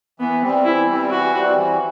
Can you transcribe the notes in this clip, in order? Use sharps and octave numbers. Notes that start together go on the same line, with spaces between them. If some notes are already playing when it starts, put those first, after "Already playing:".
E3 B3
G3 C4
E3 E4
G3 C4
E3 F#4
G3 C4
E3